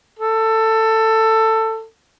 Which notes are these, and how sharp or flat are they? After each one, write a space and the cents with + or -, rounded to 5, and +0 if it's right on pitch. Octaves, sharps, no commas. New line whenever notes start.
A4 +15